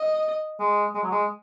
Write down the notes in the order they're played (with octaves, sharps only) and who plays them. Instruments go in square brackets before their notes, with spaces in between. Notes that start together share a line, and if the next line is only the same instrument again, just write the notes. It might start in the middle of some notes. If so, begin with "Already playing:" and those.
Already playing: [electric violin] D#5
[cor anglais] G#3
G#3
F#3
G#3